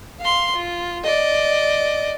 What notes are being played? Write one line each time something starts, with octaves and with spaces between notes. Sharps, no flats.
F5 C6
F4
D5 D#5